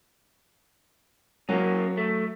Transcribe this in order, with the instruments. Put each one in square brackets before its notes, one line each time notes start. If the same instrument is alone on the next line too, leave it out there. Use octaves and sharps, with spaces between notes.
[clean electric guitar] F#2 A#3 C#4 [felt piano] F#3
[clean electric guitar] A3